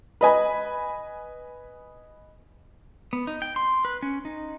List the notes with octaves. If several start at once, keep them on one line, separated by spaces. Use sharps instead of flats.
B4 D#5 G#5 B5
B3
D#4
G5
C6
B4
C#4
D#4